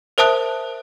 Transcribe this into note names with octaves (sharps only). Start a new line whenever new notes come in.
A#4 C5 E5 A5 D#6 F#6